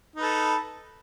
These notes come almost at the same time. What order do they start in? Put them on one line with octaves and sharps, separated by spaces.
D#4 B4 A4